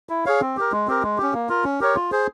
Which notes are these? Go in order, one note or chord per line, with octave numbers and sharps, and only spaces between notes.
E4
G#4 C#5 F5
C4
G4 A#4
G#3
C4 G4 A#4
G#3
C#4 G4
A#3
F4 A#4
C#4
G4 A#4 C#5
F4
G#4 C5